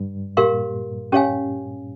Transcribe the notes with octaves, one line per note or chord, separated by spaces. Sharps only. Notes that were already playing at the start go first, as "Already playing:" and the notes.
Already playing: G2
A#2 G4 A#4 F5 C6
C#4 G4 C#5 F5 G#5